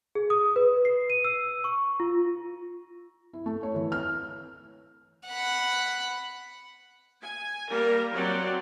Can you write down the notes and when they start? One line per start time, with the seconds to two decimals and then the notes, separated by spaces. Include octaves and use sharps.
0.15 G#4
0.30 D#6
0.56 B4
0.85 C7
1.10 D#7
1.24 E6
1.64 C#6
2.00 F4
3.33 E4
3.46 A3
3.63 C#5
3.75 E3
3.92 F6
5.28 F#5 B5
7.22 G#5
7.70 G3 A#3 A#4
8.14 F#3 C4 D5